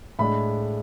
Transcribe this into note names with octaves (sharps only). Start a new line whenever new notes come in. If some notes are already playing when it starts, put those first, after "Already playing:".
A2 G#3 D4 B5